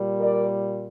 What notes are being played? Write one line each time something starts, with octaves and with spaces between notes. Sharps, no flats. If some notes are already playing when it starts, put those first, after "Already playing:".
Already playing: A#2 G3
A#4 D5